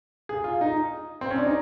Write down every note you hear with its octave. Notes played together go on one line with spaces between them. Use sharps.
G#4
F4
D#4
C4
C#4
D4
D#4